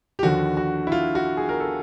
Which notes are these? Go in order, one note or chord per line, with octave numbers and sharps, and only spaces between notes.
G4
D#2 D3 F3 F#4
F#4
E4
F4
F#4
G#4
A#4
A4